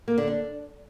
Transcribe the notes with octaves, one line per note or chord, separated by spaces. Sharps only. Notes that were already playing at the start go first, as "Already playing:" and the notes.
A#3
D3
D4